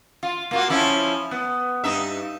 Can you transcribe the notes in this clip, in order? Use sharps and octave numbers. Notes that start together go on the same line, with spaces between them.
F4
A#3 F4 F#4
F3 C#4 E4
B3
G2 D#4 E5